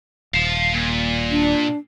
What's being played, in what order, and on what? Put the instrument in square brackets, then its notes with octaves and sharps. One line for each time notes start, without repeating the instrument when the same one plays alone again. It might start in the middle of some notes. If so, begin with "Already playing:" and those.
[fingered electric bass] D#1 [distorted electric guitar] F5 A5
[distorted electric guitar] A#2
[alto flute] D4